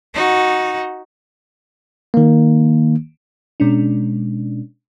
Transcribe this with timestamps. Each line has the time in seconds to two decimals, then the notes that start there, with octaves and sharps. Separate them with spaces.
0.15 D#4 F#4
2.14 D#3 A#3
3.60 B2 G#3 C#4 D4